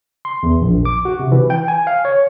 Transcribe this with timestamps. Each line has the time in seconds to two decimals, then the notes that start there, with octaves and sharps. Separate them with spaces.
0.25 C6
0.43 E2
0.61 A#1
0.85 D6
1.05 F#4
1.19 C3
1.32 E3
1.50 G5
1.68 G#5
1.87 F5
2.05 C#5